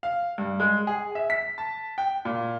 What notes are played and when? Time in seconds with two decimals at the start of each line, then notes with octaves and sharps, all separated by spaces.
0.03 F5
0.38 G2
0.60 G#3
0.87 G#4
1.15 E5
1.30 B6
1.58 A5
1.98 G5
2.25 A#2